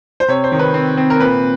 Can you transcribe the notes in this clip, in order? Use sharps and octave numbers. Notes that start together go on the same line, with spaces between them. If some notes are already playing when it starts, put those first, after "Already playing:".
C5
C3 C#5
C5
D#3
B4
C4
C4
A#4
A#2 B4